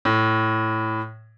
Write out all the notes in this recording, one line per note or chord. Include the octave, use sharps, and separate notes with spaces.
A2